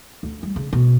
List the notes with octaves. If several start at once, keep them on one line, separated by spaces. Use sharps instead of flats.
D2
G3
C#3
B2